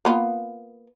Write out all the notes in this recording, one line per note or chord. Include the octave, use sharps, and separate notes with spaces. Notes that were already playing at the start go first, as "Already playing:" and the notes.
A#3 B3 F4